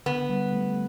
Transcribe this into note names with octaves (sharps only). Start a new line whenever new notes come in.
D3 B3
G3
A3